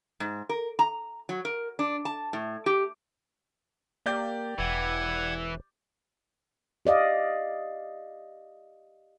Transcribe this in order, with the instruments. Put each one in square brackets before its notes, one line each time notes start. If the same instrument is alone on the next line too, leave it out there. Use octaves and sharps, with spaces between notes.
[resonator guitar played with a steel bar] G#2
A#4
A#5
F#3
A#4
D4
A5
A2
G4
[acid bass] A#3 [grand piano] G4 D5 G6
[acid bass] E1 [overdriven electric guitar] E3 [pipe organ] F#5 G#6
[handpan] G4 D5 D#5 F5